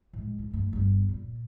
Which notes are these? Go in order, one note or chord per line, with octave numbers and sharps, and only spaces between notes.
A2 G#3
D2
G2 A3
G1 B3
A#2